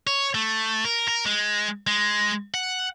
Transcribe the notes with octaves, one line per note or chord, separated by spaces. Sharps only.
C#5
A3
A#4
A#4
G#3
G#3
F#5